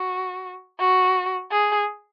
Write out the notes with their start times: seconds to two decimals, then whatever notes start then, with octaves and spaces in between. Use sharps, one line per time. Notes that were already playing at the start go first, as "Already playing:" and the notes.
Already playing: F#4
0.80 F#4
1.51 G#4